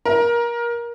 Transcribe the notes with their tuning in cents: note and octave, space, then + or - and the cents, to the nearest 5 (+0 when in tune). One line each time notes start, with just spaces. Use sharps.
A#4 +20